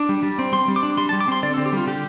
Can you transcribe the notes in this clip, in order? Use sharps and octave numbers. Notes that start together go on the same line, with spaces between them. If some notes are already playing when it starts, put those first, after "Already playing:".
Already playing: D4 D6
G3
G3
C4
G3 C6
G3
D6
D4
G3 C6
A5
G3
D6
C4 C6
D3 D5
A4
C4
G4
G3 F4
D3 G4